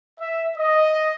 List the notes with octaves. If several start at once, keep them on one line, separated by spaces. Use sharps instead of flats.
E5
D#5